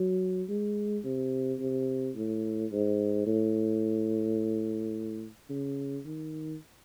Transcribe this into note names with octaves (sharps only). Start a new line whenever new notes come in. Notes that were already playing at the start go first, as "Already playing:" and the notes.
Already playing: F#3
G#3
C3
C3
A2
G#2
A2
C#3
D#3